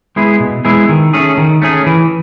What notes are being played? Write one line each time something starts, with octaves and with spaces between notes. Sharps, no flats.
G#3 B3 E4 G#4
B2
G#3 B3 E4 G#4
D#3
A3 C#4 G#4
D#3
A3 C#4 G#4
E3